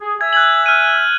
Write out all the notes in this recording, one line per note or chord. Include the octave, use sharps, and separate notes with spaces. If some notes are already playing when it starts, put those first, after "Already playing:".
G#4
E5 G#5 E6 G#6
F#6 G#6 F#7
F6 D#7